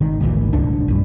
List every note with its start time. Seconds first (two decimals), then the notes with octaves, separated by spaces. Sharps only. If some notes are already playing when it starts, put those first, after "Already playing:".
0.01 G#1 D#3
0.21 G#1 D2 A#2 E3
0.53 D1 C2 D3 D4
0.88 A#1 G2